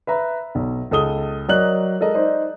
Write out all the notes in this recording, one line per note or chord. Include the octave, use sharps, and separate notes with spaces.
B4 E5 A#5 B5
B1
C#2 A4 D#6 G7
F#3 A#4 D5 D#5 F#6 F#7
G#3 A4 A#4 D#5
D#4 C5 D5 D#5